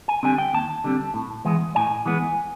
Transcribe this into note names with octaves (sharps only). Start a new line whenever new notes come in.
G#5
D3 G3 C4 G#5
G5
D#2 A5
D3 G3 C4
A2
E3 G#3 B3
A2 G#5
E3 G#3 B3